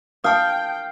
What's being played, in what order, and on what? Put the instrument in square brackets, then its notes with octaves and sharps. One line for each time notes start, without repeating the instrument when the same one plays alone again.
[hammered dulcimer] F5 [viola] G5 [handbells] A5 D#6